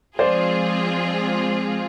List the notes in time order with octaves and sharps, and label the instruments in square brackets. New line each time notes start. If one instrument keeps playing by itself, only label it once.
[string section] F3 G#3 C4 F4 G#4 [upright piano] C5 D5